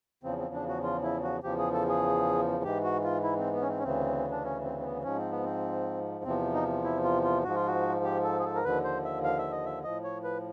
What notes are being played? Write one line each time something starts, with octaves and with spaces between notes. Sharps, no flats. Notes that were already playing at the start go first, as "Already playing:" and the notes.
E2 C#3 F3 C4
C4
D4
F#4
F4
E4
F#4
E2 C#3 F3 G4
G#4
A4
G#4
G#2 E3 G4
F#4
F4
E4
C4
B3
C#4
C4
C#4
D2 C#3 E3 C4
D4
C#4
C4
C4
B3
G#2 F3 C#4
C4
B3
C4
E2 C3 F3 C4
D#4
E4
F4
F4
G#2 F3 F#4
F4
F#4
G4
A4
G#4
A4
A#4
D#2 D3 F3 B4
C5
E5
F5
E5
D#5
E5
A2 F3 D#5
C#5
B4